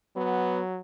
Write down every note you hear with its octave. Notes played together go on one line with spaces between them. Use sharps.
F#3 B3